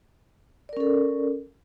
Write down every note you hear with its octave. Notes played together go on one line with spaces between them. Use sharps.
C#4 A4 A#4 D5